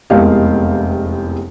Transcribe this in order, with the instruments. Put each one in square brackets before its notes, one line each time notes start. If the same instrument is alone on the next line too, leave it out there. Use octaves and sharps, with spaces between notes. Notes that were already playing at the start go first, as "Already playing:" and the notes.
[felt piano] F1 E2 G#3 A#3 G4 F5